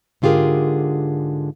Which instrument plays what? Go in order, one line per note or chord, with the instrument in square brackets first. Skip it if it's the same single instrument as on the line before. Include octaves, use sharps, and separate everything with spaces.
[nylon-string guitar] G#2 D3 F4 G4 G#4 A#4